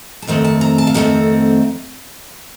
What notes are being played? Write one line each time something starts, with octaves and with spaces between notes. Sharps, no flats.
A5
F2 D#3 A3 C4 F#5
A5
A#5
A5
F5
F2 D#3 A3 C4 F#5